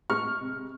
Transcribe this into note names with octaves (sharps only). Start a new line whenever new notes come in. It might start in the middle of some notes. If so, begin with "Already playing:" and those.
G#3 C#6 F6
C3